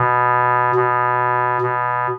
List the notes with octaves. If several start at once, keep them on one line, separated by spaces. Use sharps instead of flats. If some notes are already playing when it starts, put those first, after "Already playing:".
Already playing: B2
B2
B2